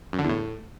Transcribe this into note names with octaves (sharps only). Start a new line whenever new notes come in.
F#2
D3
E2
A2